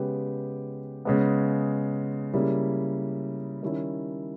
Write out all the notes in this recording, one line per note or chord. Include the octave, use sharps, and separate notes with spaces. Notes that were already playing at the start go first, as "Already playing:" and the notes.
Already playing: C#3 G#3 B3 G4 B4
C#3 G#3 B3
C#3 G3 A#3 E4
D#3 G3 C#4 E4